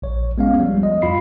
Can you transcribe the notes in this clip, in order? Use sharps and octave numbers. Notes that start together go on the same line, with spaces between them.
A#1 C#5
G#3 B3 C#4 F5
F3 G3
D#5
F2 F4 B5 C7